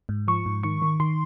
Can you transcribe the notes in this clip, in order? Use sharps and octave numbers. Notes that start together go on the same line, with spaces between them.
G#2
F3 C#6
G#2
D#3 C#6
D#3
D#3 C6